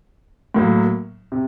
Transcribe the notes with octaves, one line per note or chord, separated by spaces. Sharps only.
A2 F#3 A#3
C3